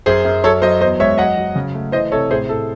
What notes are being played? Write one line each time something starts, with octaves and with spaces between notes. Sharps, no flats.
F#2 G#4 C5
F#2
F#3 A4 C#5
F#3 C5 D#5
E2 C5 D#5
G#3 C#5 E5
F#3 D#5 F#5
F#3
C#3
A3
E3 C5 D#5
C3 A4 C#5
A2 G#4 C5
A2 A4